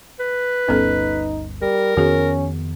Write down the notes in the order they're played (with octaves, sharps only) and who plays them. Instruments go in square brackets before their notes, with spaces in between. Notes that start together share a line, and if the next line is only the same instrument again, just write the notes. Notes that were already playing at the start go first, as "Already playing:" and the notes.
[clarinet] B4
[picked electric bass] G1 D2 G2 [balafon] B3 C#4 A4 [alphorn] D#4
[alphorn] G3 [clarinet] A#4
[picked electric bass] F2 D#3 B3 [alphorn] C#4 [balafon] F#4 G#4